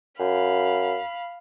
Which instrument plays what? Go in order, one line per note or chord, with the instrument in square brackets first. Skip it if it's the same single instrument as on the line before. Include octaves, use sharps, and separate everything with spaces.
[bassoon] F#2 [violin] F5 B5